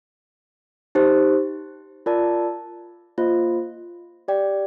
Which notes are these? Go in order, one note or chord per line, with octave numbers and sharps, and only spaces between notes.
D#4 G4 C5
F4 A#4 D5 A5
A#3 F4 C5 D#5
G4 D5 G5